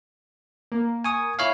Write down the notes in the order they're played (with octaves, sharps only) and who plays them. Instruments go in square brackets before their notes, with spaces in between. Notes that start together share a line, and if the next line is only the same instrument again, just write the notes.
[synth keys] A#3
[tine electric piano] G#5 C#6 D#6
E4 C#5 F5